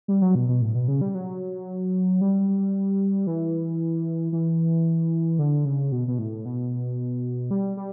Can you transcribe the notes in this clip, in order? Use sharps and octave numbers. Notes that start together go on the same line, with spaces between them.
G3
F#3
B2
B2
A2
B2
C#3
G3
F#3
G3
E3
E3
D3
C#3
B2
B2
A2
B2
G3
G3